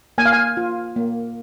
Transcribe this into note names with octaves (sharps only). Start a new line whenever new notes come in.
A#3 G#5
F5
G#5
F4
A#3